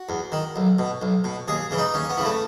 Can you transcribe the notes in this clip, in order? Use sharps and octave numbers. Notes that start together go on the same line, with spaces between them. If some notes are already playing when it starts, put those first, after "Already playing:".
Already playing: F#4
E2
D#3
B1
B2
B1
B2
D#2 G#4
C#3 E3
D#4
D#2 C#4
B3
C#3 E3
A3